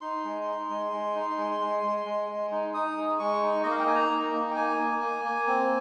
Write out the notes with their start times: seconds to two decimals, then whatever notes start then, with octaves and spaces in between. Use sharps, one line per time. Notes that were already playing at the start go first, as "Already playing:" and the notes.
0.01 D#4 C6
0.24 G#3
0.47 D#4
0.70 G#3
0.92 G#3
1.16 D#4
1.38 G#3
1.60 G#3
1.84 G#3
2.06 G#3
2.29 G#3
2.52 D#4
2.74 D#4 D#6
2.97 G#3
3.19 G#3 C#6
3.42 D#4
3.63 A#3 D#5
3.71 F5
3.79 G5
3.87 D#4 G#5
3.95 A#5
4.11 A#3
4.34 D#4
4.51 G5
4.56 A#3 G#5
4.79 A#3
5.01 A#3
5.25 A#3
5.47 C4